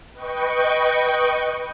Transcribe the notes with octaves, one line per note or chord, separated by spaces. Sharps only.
B4 D#5 G5 C#6